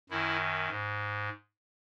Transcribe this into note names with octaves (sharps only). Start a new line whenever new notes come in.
F#2 D#3 E4
G#2